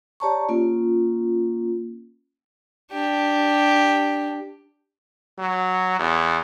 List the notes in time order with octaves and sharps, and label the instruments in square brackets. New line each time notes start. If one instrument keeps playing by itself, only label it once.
[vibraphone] G4 C#5 D5 A5 A#5 C#6
A#3 C#4 F4
[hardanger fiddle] D4 G4
[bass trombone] F#3
E2